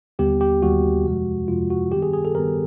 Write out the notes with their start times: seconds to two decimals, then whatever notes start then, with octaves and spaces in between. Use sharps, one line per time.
0.19 D#2 D3 G3 B3 G4
0.41 G4
0.63 D#2 D3 G3 B3 F#4
1.05 F2 C3 F3 G#3
1.48 F2 C3 F3 G#3 F4
1.70 F#4
1.92 G2 D#3 G3 B3 G4
2.03 G#4
2.13 G#4
2.25 A4
2.35 G2 D#3 G3 B3 A#4